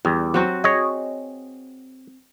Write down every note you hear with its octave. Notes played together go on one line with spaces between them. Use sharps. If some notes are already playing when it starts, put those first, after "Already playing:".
E2 G3
F#3 C4 F#4
G#4 C#5 D#5